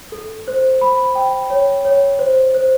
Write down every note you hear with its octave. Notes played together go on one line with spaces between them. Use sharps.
A4
C5
B5
G5
C#5
C#5
C5
C5